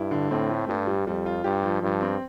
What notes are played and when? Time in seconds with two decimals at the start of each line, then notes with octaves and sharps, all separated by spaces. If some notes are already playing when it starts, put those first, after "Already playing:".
Already playing: G2 E4
0.11 D3
0.31 A2 C4
0.50 A3
0.68 G2 G3
0.87 G3
1.07 F2 G3
1.26 F4
1.44 G2 G4
1.63 F3
1.82 G2 F3
2.01 C4